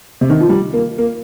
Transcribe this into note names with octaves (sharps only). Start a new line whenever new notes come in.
C3
D#3
F3
G3
A#3
A#3